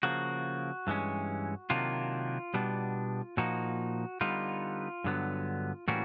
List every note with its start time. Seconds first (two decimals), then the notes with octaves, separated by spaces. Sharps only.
0.03 C#3 F3 A#3 F#4
0.87 G2 E3 G#3 C#4
1.70 C3 D#3 F#3 A#3 D4 F4
2.54 B2 G3 B3 D4
3.37 A#2 F3 A#3 D#4 F#4
4.21 D3 G3 B3 D#4 F4
5.04 G2 D3 F#3 B3
5.88 A2 E3 G3 A#3 C#4 F#4